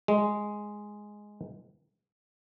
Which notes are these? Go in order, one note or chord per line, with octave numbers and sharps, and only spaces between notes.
G#3